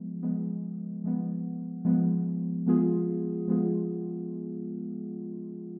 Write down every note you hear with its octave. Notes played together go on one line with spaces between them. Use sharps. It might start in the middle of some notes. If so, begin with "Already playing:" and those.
Already playing: F3 G#3 B3
F3 G#3 B3
F3 G#3 B3
F3 G#3 B3
F3 G#3 B3 F4 G#4
F3 G#3 B3 F4 G#4